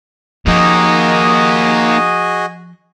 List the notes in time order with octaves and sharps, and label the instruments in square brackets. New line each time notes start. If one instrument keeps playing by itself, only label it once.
[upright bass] F3 C#4 [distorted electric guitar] A#3 D#4 [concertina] F#4 G#4 D#5